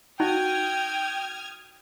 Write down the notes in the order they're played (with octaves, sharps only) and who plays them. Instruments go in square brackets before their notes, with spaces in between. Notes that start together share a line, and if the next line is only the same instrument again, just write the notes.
[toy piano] D#4 [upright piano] F#4 [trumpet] G5 [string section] D#6 F6 G#6